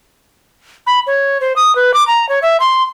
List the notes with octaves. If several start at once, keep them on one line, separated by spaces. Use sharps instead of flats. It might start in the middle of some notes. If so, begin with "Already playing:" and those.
B5
C#5
C5
D#6
B4
D6
A#5
C#5
E5
C6